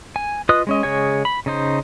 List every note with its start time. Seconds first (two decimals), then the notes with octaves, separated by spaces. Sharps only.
0.16 G#5
0.49 F4 B4 D#5 D#6 F#6
0.67 G#3 C#4 D#5
0.83 C#3 G#3 G#4 C#5 G#5
1.25 B5
1.46 C#3 D#4 C5